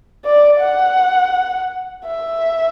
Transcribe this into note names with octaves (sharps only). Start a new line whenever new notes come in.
D5
F#5
E5